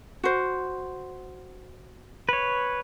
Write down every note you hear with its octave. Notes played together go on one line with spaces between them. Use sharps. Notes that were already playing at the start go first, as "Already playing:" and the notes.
F#4 C5
B4 C#5